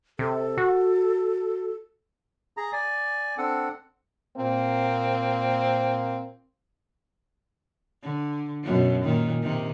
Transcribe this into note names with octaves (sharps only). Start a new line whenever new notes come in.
C3 A4
F#4
G#4 A#5
D5 G#5
C4 D4 A4 F#5
A#2 A#3 C4
D3
F#2 B2 F#3
A#2 D#3
C3 D#3